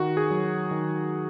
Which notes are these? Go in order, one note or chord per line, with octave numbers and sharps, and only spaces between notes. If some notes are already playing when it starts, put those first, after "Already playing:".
Already playing: D#3 F#4
G#4
F#3
D#3